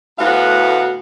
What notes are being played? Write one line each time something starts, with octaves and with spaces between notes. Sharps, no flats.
D2 A2 B3 F#4 F5